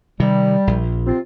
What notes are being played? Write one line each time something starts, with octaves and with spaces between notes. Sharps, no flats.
C3 D#3 G3
A#1
C3 C4 F4